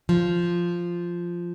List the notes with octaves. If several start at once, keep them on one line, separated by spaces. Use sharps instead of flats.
F3